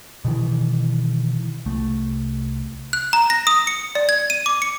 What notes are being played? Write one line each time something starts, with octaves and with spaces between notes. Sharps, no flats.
B2 D#3 E3
C2 A3
F#6
A#5
A#6
D#6
C#7
D5
G#6
D#7
D6
C#7